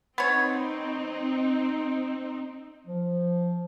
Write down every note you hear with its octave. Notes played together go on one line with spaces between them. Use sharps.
B3 C4 D#4 C#5
F3